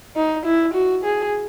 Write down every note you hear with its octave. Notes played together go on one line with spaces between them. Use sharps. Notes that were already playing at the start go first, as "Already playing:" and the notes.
D#4
E4
F#4
G#4